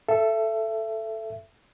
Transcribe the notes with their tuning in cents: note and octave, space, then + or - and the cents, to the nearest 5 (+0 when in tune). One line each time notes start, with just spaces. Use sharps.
A4 +0 E5 +25